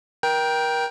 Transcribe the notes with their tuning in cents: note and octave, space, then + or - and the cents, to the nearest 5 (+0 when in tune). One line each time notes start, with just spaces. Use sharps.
A#4 +30 G5 +0